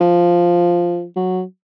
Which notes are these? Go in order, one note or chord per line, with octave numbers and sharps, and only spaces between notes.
F3
F#3